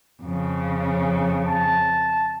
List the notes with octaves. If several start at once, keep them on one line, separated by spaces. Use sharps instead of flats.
F2 C#3
A5